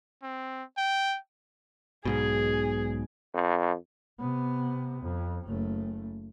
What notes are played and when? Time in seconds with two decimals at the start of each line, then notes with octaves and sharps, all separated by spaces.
0.23 C4
0.78 G5
2.05 B1 G#2 B2 G#4
3.34 F2
4.20 C3 B3
5.02 F2
5.47 F#1 A3